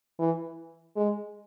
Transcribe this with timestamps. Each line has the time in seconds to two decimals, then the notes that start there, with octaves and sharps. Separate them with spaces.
0.19 E3
0.96 G#3